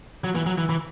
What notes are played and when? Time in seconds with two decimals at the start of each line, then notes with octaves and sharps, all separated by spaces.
0.24 F#3
0.35 E3
0.46 F#3
0.58 E3
0.69 E3